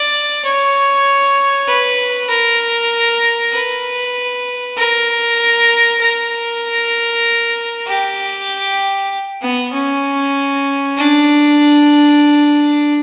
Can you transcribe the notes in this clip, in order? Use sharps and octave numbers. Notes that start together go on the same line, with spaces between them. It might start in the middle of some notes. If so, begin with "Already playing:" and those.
Already playing: D5
C#5
B4
A#4
B4
A#4
A#4
G4
B3
C#4
D4